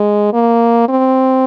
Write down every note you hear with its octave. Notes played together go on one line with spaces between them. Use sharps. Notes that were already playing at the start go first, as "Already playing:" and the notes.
Already playing: G#3
A#3
C4